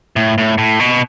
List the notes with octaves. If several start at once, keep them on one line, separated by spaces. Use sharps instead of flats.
A2
A2
A2
B2